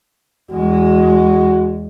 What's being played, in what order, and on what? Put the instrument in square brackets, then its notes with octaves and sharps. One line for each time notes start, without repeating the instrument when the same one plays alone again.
[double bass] E2 G#3 [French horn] F#4